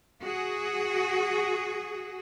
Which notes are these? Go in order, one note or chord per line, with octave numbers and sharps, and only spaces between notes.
F#4 G#4